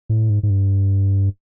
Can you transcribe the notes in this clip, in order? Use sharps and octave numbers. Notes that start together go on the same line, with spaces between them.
A2
G#2
G#2
G2